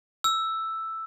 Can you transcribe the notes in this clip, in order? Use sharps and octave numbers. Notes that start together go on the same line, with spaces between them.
E6